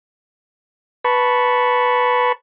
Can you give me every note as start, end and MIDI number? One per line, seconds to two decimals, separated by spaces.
1.05 2.32 71
1.05 2.32 81
1.05 2.32 83
1.05 2.32 85